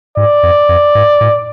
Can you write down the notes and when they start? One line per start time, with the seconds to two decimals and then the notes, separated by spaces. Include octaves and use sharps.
0.17 G#2 D5
0.43 F2
0.69 F2
0.95 G#2
1.21 A2